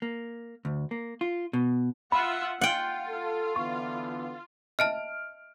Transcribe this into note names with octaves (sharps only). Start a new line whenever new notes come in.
A#3
D2
A#3
F4
B2
F4 E5 F#5 B5
F4 F#5 G5
A4
D3 E3 B3 C#6
D#5 E5 A5 F6 D7